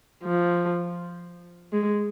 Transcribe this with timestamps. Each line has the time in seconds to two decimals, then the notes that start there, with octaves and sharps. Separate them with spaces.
0.24 F3
1.72 G#3